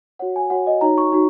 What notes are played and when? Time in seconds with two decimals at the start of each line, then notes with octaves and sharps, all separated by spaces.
0.19 F#4 C#5 F#5
0.36 G#5
0.50 F#4 C#5 F#5
0.67 D#5
0.81 D#4 F#4 C#5 A#5
0.98 C#6
1.12 D#4 F#4